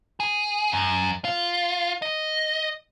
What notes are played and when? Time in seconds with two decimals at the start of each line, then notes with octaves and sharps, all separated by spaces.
0.20 G#4
0.72 F#2
1.25 F4
2.02 D#5